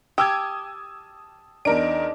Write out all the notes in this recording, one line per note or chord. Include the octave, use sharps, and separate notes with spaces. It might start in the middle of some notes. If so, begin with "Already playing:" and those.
G4 A5 D#6 E6 G#6
E2 D4 D#4 A#4 D#5 D7